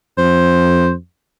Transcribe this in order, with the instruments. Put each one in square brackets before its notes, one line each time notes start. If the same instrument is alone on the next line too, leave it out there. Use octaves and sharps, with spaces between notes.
[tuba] F2 [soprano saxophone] C5